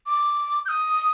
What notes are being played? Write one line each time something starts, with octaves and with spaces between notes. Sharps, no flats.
D6
G6
D#6